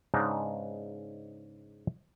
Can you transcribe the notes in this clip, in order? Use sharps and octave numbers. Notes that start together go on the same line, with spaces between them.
G#2 C#3 G#3 B3 D4 D#4